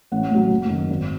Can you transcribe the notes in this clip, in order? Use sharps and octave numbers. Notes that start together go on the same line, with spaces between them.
A1 F#5
A2 F#3
F#1
F#2 D#3
G#1